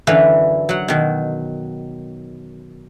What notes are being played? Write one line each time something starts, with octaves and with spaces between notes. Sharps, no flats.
F#2 D3 E3 B4 F5
F#3 F#5
B2 D#3